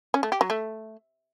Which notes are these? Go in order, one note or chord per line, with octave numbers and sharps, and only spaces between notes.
C#4
A3
G4
F#3
A3